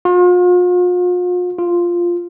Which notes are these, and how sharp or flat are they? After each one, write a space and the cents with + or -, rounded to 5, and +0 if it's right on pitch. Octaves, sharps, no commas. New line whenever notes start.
F4 +40
F4 -5